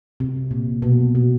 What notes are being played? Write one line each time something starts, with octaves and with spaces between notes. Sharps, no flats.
C3
A#2
B2
B2